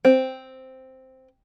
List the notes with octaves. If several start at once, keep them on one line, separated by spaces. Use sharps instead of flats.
C4